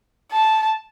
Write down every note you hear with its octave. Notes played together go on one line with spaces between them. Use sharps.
A5